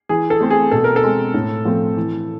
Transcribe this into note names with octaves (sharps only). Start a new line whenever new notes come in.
E3 G#4
A4
A3 C4
G#4
B2 A4
A#4
A4
G#3 C4
A2
F3 A3 C4
E3